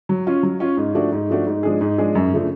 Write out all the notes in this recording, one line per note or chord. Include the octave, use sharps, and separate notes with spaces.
F#3
C#4 F4
F#3
C#4 F4
G#2
F3 A3 D4 F#4
G#2
F3 A3 D4 F#4
G#2
F3 G#3 D4 G#4
G#2
F3 G#3 D4 G#4
F#2
C#3 F3 A3 D4